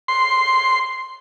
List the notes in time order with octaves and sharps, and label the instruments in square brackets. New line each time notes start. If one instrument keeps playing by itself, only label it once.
[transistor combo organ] C6